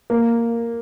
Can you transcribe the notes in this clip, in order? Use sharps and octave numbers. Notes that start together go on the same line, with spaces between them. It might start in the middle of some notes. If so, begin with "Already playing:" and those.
A#3